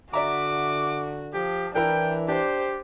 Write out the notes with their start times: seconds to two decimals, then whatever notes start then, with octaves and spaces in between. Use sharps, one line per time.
0.13 D3 F#4 D5 E5 A#5 D6
1.34 F3 G4
1.75 E3 D4 E4 A#4 B4 G5
2.28 D4 G4 C5